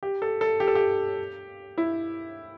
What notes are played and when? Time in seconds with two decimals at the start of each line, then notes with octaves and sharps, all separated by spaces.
0.03 G4
0.22 A4
0.41 A4
0.60 G4
0.67 A4
0.75 G4
1.78 E4